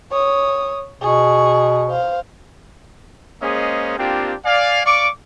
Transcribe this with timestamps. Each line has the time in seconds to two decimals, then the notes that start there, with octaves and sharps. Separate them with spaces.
0.12 C#5 D#6
1.02 B2 G#4 C#6
1.89 C5 F5
3.42 G#3 A#3 C#4 G#4 C5 D#5
3.99 A#3 C4 D4 F4 G4
4.45 D5 F5 G#5
4.85 D5 F5 C#6 D6